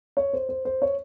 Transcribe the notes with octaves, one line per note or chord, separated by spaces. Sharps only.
C#5
C5
C5
C5
C#5